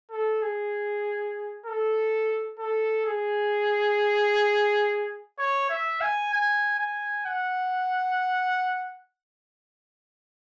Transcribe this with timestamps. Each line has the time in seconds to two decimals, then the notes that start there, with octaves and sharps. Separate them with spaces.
0.11 A4
0.42 G#4
1.66 A4
2.59 A4
3.06 G#4
5.39 C#5
5.70 E5
6.01 G#5
6.33 G#5
6.79 G#5
7.25 F#5